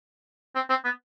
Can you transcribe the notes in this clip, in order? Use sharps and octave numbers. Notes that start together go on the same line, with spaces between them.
C4
C4
B3